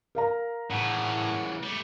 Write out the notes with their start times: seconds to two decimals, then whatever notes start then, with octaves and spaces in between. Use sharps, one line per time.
0.15 A#4 F5 A#5
0.71 A2 C#3 E3 F#5
1.63 G3 A3